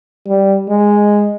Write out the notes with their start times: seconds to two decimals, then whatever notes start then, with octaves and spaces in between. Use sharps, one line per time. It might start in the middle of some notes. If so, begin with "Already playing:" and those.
0.27 G3
0.69 G#3